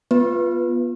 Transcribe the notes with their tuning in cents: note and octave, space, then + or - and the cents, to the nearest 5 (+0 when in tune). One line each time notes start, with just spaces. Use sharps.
B3 -20 F4 +0 B4 +0